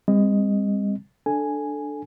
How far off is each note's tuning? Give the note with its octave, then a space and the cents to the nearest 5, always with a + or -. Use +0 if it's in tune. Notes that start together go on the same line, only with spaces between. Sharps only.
G3 +45 C4 +0 D#5 +0
D4 +5 A4 -5 G#5 +0